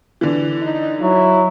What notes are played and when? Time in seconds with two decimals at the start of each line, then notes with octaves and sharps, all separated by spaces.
0.21 D3 E3
0.62 D#4
1.01 F#3 E4